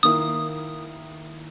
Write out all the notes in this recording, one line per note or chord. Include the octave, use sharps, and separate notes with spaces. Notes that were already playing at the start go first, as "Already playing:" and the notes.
D#3 A#3 E4 D#6